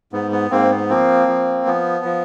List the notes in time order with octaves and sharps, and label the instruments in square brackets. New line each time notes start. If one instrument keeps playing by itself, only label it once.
[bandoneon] G#2 B3
B3
G#2 A#3 C4
B3
F3 A#3 C4
F3
F3 B3
F3